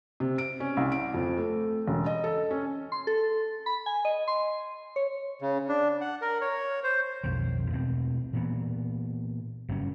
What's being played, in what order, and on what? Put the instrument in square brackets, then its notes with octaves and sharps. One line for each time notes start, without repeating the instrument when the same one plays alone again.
[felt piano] C3
D7
C#4
C2
D7
F2
A3
E1
D#5
A4
C#4
[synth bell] C6
A4
B5
G#5
D#5
C6
C#5
[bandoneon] C#3
D4
F#5
A#4
C#5
C5
[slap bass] B1 F2 D#3
E2 B2 C4
A#2 E3 B3
F#1 G2 G3 C#4